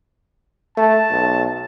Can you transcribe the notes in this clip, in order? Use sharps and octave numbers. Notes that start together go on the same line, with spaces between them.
A3 A5
B1